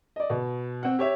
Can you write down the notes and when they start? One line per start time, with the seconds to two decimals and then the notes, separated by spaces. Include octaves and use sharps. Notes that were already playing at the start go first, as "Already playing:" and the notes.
0.16 D5 D#5
0.30 B2
0.83 C4 F#5
0.99 G4 C#5 E5